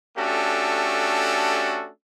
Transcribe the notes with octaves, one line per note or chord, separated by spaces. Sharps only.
A3 C#4 D4 F#4 G4 A4